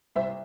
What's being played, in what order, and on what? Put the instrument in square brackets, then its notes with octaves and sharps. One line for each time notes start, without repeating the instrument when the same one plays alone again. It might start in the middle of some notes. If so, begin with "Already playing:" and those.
[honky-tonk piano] C2 C5 E5